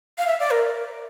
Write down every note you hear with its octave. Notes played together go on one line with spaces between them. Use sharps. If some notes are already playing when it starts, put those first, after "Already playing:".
F5
E5
D5
A#4